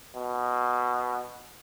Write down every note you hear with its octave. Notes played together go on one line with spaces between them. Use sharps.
B2